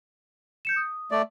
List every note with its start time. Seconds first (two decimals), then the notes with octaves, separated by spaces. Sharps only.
0.65 G6 C#7 E7
0.76 D#6
1.11 A3 D5